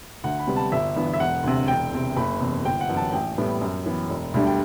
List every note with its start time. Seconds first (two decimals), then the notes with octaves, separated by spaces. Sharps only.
0.24 D2 F#5
0.39 B5
0.47 C3 G3 B3
0.56 A5
0.72 G1 E5
0.96 G2 E3 B3
1.14 E5
1.20 E1 F#5
1.44 D2 C3
1.68 E1 G5
1.93 E2 C3
2.16 F#1 B5
2.40 E2 C3
2.65 G1 G5
2.81 F#5
2.89 F#2 E3
2.97 A5
3.13 A1 G5
3.38 A2 G3 B3
3.61 F#2
3.86 E3 B3
4.09 E1
4.34 D2 D3 G3
4.47 G5